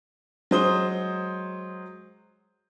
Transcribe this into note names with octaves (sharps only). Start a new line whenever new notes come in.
F#3 G#3 C5 D#6 G7